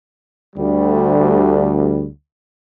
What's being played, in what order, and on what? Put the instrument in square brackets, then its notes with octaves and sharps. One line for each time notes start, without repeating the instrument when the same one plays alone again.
[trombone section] D2 G3